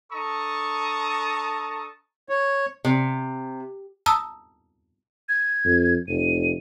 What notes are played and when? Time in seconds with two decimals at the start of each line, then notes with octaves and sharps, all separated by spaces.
0.12 D4 A4 A5 A#5 C#6 D#6
2.29 C#5
2.85 C3
4.06 A5 A#5 D#6 E6
5.29 G#6
5.65 F2
6.08 F1 D#7